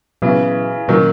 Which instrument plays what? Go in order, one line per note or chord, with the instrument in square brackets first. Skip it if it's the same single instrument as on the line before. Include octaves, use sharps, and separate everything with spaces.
[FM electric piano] A#2 F#3 B3 E4 [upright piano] C#3 E3
[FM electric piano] A#2 A#3 C#4 F#4 [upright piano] D#3 F#3